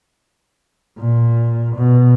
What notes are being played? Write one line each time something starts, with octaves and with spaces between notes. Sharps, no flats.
A#2
B2